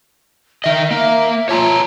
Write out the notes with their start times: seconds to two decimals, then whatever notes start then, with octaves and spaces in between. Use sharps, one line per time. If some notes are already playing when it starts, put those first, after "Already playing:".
0.64 D#3 D#5 E5
0.91 A#3
1.49 F4 C#5 A5 A#5